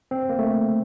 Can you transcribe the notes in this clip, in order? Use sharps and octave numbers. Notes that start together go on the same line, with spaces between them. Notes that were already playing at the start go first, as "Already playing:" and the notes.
C4
A#3
A3